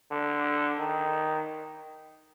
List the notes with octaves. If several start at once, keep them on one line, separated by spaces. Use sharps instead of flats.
D3
D#3